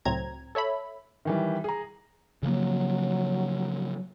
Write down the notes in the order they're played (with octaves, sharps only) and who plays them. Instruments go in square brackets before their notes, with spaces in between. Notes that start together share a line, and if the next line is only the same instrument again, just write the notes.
[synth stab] C#2 A2 F#3 C4 A#5 G#6
A4 C#5 E5 B5
[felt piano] D#3 E3 G3
G#4 A#5
[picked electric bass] C#3 F3 A#3 [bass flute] F#3